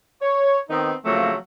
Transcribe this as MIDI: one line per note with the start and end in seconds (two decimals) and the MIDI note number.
0.22 0.58 73
0.70 0.93 51
0.70 0.93 59
0.70 0.93 60
0.70 0.93 63
1.04 1.34 49
1.04 1.34 53
1.04 1.34 54
1.04 1.34 57
1.04 1.34 58
1.04 1.34 60